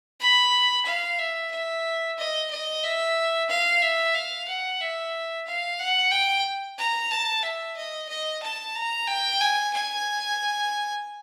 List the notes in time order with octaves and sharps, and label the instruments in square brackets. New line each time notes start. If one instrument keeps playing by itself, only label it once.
[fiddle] B5
F5
E5
E5
D#5
D#5
E5
F5
E5
F5
F#5
E5
F5
F#5
G5
A#5
A5
E5
D#5
D#5
A5
A#5
G5
G#5
G#5